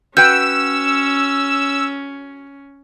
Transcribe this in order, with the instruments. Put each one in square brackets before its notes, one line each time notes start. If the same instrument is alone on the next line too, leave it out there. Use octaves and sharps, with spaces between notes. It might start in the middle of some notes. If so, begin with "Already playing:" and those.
[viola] C#4 [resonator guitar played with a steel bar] F#4 B4 G5 [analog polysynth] E6 [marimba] G6